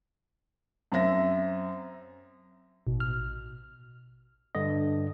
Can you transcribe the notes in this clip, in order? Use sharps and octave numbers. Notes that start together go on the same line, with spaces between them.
F#2 C4 E5 A#6
A1 B2
F6
G2 D3 D#5